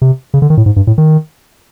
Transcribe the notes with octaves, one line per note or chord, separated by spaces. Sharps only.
C3
C#3
D3
D#3
A2
G#2
G2
A2
D#3